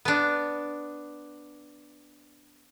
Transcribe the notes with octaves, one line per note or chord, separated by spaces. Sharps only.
B3 D4